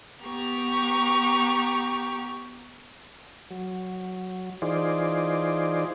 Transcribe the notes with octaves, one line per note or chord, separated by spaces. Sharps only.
B3 G4 A#5 C#6
F#3
E3 D#4 F4 G#4 C5 D5